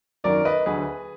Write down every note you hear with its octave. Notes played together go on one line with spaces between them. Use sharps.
G#1 F#2 D#3 F#3 A#4 D5
B4 D#5
D2 D3 F#3 G#4 B4